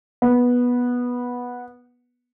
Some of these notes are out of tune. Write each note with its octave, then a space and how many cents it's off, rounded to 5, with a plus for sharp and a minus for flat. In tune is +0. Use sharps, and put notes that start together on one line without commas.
B3 -10